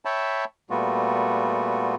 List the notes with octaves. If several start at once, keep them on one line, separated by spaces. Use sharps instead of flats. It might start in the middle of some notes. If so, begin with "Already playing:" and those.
C#5 E5 G5 A5 B5
A#2 G3 A3 B3 F4 F#4